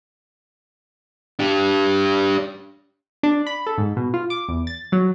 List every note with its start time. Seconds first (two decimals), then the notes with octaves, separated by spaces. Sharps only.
1.39 D4 G4
3.23 D4
3.47 B5
3.67 A4
3.78 G#2
3.96 B2
4.14 F4
4.30 D6
4.49 E2
4.67 A6
4.92 F#3